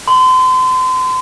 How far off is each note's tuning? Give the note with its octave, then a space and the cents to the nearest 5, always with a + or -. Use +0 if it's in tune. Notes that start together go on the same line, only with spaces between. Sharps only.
C6 -35